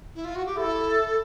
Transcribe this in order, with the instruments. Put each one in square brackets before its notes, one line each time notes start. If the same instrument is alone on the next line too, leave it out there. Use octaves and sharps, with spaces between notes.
[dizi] E4
F4
F#4
G4
[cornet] E4 [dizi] A4